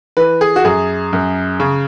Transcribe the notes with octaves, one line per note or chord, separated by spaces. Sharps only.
E3 B4
G#4
F#4
F#2 G#4
F#2
C#3